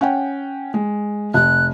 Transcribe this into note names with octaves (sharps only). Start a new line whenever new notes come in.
C#4 F#5 G5
G#3
F1 F#6